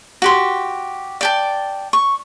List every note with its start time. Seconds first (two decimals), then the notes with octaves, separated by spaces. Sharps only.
0.22 F#4 G4 C6
1.21 D5 G5 A5
1.93 C#6